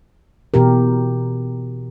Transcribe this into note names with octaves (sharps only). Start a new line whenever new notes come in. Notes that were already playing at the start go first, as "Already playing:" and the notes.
B2 E3 G4 A#4